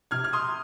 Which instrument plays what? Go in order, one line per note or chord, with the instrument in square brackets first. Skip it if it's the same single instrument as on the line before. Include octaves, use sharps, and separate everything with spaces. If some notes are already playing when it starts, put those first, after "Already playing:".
[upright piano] C3 F6 G#6
F6
C6 D#6